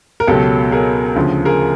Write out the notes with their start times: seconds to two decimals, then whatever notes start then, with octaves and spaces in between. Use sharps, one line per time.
0.20 A#4
0.27 C#2 B2 F#3 G4 A4
0.72 G#4 A#4
1.16 D2 C#3 F3
1.45 G#4 A#4